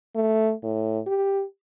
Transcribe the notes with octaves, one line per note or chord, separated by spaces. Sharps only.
A3
A2
G4